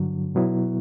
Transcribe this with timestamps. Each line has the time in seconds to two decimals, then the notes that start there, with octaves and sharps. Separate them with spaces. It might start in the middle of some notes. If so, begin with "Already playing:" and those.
Already playing: G2 D3 F#3
0.35 B2 F#3 B3 E4